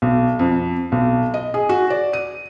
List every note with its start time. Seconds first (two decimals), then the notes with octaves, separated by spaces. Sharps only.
0.02 B1
0.39 F2
0.92 B1
1.34 D#5
1.54 G#4
1.69 F#4
1.90 D5
2.13 D#7